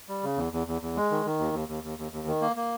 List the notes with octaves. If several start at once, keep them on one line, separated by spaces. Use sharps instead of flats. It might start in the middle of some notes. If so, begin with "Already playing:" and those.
G3
C#3
E2
E2
E2
E2
G#3
D#3
D#3
D#2
D#2
D#2
D#2
D#2
D#2
D#3
A#3
A#3